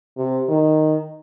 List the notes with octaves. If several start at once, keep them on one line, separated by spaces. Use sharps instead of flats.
C3
D#3